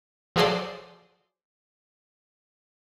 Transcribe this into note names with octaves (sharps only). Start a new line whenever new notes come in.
F3 F#3 G#4 A4 C5 D5